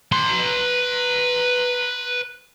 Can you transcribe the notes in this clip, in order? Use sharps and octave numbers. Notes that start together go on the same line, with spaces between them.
B4 C6